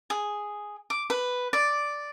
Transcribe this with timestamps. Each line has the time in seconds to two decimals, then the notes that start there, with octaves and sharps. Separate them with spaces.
0.10 G#4
0.90 D6
1.10 B4
1.53 D5